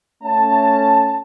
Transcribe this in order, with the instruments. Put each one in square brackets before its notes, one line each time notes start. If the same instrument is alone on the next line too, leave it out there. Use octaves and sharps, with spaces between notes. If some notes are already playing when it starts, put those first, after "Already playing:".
[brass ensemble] A3 C#4 A5